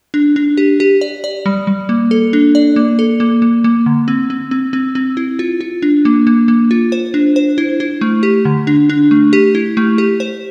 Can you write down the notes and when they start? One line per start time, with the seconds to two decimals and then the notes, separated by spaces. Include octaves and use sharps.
0.14 D4
0.36 D4
0.57 G4
0.80 G4
1.01 D5
1.24 D5
1.46 G3
1.67 G3
1.89 A#3
2.11 A4
2.33 D4
2.55 D5
2.76 A#3
2.99 A4
3.20 A#3
3.42 A#3
3.64 A#3
3.86 D3
4.08 C4
4.30 C4
4.51 C4
4.73 C4
4.95 C4
5.17 E4
5.39 F4
5.61 F4
5.82 D4
6.05 A#3
6.27 A#3
6.48 A#3
6.71 F4
6.92 C5
7.14 D4
7.36 C5
7.58 E4
7.80 E4
8.01 A3
8.23 G4
8.45 D3
8.67 D4
8.90 D4
9.11 A3
9.33 G4
9.55 E4
9.77 A3
9.98 G4
10.20 C5